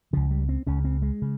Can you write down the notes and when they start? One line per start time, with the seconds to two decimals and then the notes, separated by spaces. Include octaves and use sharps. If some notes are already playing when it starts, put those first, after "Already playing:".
0.13 C#2 C#3 F3
0.31 G3
0.49 C4
0.67 C#2 C#3 C#4
0.85 C4
1.02 G#3
1.22 C#3